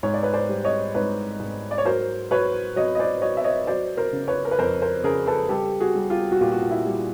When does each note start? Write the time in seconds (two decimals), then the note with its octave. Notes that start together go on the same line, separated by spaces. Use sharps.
0.03 G#2 C#5
0.14 D5
0.22 B4 C#5
0.33 C5 D5
0.49 G3
0.65 C#5 D#5
0.95 G#2 B4 C#5
1.40 G#2
1.71 D5
1.78 C#5
1.85 F#3 A#4 C5
2.31 F#3 B4 C#5
2.76 F#3 C#5 D#5
2.95 D#5
3.00 C5 D5
3.22 F#3 C#5 D#5
3.37 E5
3.44 C#5 D#5
3.67 F#3 C5 D5
3.97 A#4 C5
4.13 C#3
4.28 B4 C#5
4.45 A#4
4.51 B4
4.58 F2 A#4 C5
4.82 A#4 C5
5.04 C#3 G#4 A#4
5.27 A4 B4
5.49 G3 G4 A4
5.80 F#4 G#4
5.95 G3
6.10 F4 G4
6.32 F#4
6.41 A#2 F4 G4
6.52 F#4
6.61 F4
6.71 E4
6.86 G3